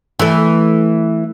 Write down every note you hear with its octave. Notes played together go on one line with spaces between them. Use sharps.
E3 A3